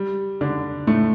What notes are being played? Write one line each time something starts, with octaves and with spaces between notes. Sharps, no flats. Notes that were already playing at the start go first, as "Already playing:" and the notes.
Already playing: G3
D3 D4
A2 A3